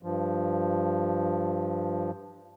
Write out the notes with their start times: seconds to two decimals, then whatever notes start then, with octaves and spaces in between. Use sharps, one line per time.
0.03 G2 F3